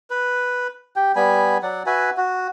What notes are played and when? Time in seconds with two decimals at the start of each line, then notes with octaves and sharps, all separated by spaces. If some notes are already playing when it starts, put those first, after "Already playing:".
0.10 B4
0.96 G4 G5
1.16 G3 B3 G#5 B5
1.63 F#3 D5 F#5
1.86 F#4 B4 E5 G#5
2.17 F#4